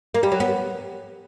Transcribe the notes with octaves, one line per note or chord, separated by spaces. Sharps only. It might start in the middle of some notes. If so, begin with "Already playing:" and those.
A#3
G3
F#3
B3